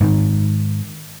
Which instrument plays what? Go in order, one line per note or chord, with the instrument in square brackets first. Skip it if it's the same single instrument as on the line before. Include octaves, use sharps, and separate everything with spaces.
[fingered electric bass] G#2 D#3